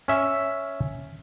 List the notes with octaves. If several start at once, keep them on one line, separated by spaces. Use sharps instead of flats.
C#4 E5